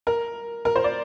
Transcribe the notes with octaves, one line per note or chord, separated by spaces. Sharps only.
A#4
A#4
C5
D5